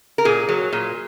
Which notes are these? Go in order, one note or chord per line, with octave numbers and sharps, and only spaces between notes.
A#4
A#2 G#4
F#3
A#2